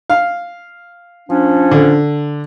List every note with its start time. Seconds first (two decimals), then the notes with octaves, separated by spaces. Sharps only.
0.10 F5
1.29 F3 C#4 D4
1.71 D3